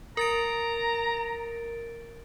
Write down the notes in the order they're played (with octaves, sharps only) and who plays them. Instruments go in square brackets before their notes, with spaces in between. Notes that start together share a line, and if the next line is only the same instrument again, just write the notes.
[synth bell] A#4 A6 D7 [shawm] A#5